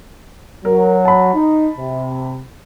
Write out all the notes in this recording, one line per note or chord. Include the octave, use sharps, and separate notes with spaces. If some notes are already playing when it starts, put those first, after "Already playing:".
F#3 A#4
A5 B5
D#4
C3